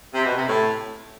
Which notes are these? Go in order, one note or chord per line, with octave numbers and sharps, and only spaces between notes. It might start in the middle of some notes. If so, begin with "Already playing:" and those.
C3
B2
C3
A2